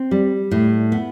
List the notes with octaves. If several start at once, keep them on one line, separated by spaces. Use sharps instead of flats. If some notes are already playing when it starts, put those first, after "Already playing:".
Already playing: C4
G3
A2
B3